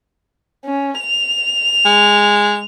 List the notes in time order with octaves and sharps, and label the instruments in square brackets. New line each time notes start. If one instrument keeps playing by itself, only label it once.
[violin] C#4
F7
[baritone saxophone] G#3